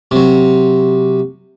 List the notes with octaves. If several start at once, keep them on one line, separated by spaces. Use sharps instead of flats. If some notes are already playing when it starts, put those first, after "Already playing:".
C3 F#3